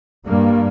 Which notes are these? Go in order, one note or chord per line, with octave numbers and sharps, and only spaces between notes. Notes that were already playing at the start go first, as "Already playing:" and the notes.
G2 G3 A#3